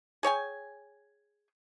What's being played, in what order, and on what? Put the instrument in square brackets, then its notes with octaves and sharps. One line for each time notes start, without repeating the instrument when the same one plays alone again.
[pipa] G#4 C#5 G5 G#5